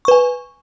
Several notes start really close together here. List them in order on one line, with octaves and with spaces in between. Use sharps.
C#6 B4 G#5